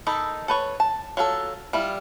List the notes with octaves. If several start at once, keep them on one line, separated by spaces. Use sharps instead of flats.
D#3 D#4 A4 B5
A4 B4 C#5
A5
F#3 F4 G#4 A4
G3 E4 F4